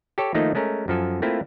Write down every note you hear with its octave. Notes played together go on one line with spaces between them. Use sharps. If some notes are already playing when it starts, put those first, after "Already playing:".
G4 A4 C#5
D#3 F3 A3 A#3 D#4
G#3 A3 C#4 A#4
F#2 F3 A4 G#5
A3 A#3 C4 E4 F4